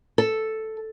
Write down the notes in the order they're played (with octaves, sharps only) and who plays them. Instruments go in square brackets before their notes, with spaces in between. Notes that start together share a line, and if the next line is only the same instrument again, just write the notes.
[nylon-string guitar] A4